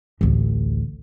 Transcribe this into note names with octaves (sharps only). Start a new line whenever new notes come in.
A1 D2